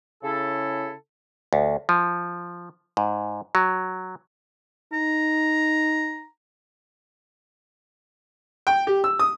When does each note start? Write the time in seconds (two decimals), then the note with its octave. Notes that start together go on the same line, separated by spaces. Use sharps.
0.22 C#3 E4 A4
1.53 D2
1.89 F3
2.97 G#2
3.55 F#3
4.93 D#4 A#5
8.67 G5
8.87 G4
9.04 E6
9.19 D#6